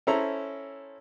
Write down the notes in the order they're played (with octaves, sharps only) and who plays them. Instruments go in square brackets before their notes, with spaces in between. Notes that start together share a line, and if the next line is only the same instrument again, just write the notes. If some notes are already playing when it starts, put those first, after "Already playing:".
[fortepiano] C#4 E4 A4 C5 A#5